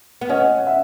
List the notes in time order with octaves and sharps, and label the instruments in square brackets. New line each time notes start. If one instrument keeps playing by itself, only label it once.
[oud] B3
[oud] C#4 [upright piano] D#5 F#5
[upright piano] F#5
E5